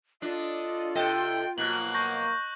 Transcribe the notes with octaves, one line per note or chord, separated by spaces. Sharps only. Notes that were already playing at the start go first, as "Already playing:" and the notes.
D4 F4 A4 D5 D#5
C3 A4 D#5 G5
B2 F3 F#3 A#3 F#6 F#7
C#6 G6 A#6